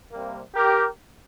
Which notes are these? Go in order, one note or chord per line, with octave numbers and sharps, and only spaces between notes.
C3 G3 A#3
G4 A#4